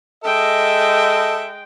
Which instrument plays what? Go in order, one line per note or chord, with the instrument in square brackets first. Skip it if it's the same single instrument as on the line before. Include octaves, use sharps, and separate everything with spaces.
[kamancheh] G#3 G5 [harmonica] A4 E5 [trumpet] D#5